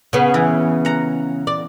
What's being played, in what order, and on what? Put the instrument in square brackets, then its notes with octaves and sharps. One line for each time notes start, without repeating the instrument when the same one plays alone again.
[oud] C#3 B3
[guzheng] E3
F#5 A#5
[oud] D5